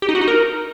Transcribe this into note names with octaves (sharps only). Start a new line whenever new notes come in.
G4
D#4
F#4
D#4
A#4